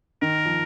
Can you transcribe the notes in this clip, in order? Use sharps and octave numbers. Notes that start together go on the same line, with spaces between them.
D#3 A#4
F3